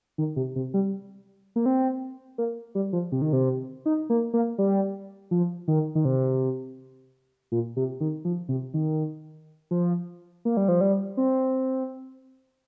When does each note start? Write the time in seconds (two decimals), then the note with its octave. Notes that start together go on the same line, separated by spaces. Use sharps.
0.18 D#3
0.36 C3
0.56 C3
0.74 G3
1.56 A#3
1.66 C4
2.38 A#3
2.75 G3
2.93 F3
3.12 C3
3.22 D#3
3.33 C3
3.86 D#4
4.10 A#3
4.33 A#3
4.58 G3
5.31 F3
5.68 D#3
5.95 D#3
6.05 C3
7.52 A#2
7.76 C3
8.00 D#3
8.25 F3
8.49 C3
8.74 D#3
9.71 F3
10.45 A#3
10.57 G3
10.68 F3
10.81 G3
11.17 C4